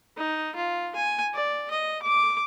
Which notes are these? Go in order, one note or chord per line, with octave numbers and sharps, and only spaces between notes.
D#4
F4
G#5
D5
D#5
D6